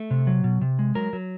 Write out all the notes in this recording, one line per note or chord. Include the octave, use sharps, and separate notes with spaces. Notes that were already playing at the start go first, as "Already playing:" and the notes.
Already playing: A3
C3
F#3
B2
C3
G#3
F#3 A#4
F#3